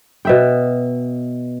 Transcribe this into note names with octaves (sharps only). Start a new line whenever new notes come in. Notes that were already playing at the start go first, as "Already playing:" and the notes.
B2 E5 G5